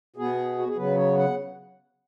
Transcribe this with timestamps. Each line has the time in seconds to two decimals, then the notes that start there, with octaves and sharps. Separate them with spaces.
0.16 B2 B3 G#4
0.59 F#4
0.68 G#4
0.77 C#3 F#3 B3 B4
0.97 C#5
1.17 F#5